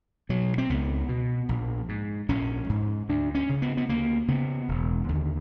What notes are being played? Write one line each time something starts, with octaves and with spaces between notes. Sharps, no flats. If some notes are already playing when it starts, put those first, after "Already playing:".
B2 F#3
C4
C#2 B3
B2
A#1
G#2
A#1 C#4
G#2
D2 D4
C#4
C#3
B3
B3
D2 A#3
C#3 B3
E1
D#2 D3